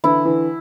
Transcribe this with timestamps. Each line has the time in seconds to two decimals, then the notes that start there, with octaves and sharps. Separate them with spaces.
0.04 D3 E3 E4
0.25 D3 E3